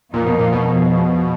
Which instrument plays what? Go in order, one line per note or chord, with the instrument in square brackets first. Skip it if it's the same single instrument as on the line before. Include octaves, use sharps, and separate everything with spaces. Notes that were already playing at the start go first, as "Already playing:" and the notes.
[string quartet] F2 F3 A#3 D#4 A#4 [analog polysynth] A#2
[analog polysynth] B2
A#2
B2
[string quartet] F2 F3 G#3